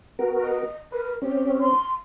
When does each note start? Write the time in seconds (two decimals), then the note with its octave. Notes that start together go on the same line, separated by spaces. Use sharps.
0.19 B3 F#4 A#4
0.43 D#5
0.92 A#4 B4
1.22 C4 C#4 G4
1.60 C6